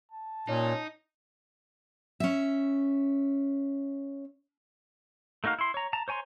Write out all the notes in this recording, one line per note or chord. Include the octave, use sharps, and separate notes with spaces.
A5
A#2 C#4 D#4
C#4 E5
A3 A#3 D#4 F#4 F5
E4 C6
C#5 A#5
A5 A#5
C5 C#5 G#5 A#5 C6